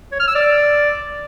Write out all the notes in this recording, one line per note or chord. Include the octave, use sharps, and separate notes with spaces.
C#5
F6
E6
D5